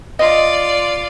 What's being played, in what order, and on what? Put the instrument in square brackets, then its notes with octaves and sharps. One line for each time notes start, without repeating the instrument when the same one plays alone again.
[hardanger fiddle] F4 D5 [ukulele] D#5